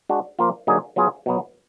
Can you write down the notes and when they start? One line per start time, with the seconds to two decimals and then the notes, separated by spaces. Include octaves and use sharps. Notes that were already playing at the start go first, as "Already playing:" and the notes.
0.09 G#3 D4 F#4
0.39 F3 A#3 F4
0.67 D3 F#3 A#3 D#4 G#4
0.96 F#3 B3 F4 G#4
1.26 B2 F#3 B3